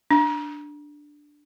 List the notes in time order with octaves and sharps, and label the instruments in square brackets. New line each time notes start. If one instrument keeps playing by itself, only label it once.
[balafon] D4